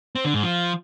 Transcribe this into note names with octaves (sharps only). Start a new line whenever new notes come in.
C4
D3
G#2
F3